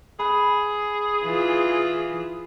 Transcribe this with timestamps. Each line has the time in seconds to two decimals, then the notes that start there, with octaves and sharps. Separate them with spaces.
0.19 G#4 B4
1.23 E3 F4